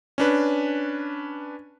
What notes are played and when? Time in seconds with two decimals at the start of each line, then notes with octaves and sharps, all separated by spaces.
0.18 C#4 D4 B4